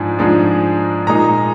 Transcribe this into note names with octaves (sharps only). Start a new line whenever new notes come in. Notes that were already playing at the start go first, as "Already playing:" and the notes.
Already playing: G#2 F3 G#3 D4
G#2 F3 G#3 D4
A#2 G#3 D#4 A#5